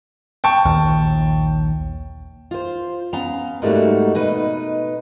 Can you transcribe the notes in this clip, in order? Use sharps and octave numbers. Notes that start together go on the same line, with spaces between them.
G5 A5 C#6
A#1 D#2
F4 C5
B3 C#4 F5 A#5
G#2 G3 A3 A#3 D#4 F#4
B2 D#4 B4